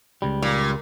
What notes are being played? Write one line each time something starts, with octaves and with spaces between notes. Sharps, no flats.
C#2 G3
A#2